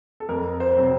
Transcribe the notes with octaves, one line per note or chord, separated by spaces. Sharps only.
A4
F2 A#4
C5
C3 F#3 C4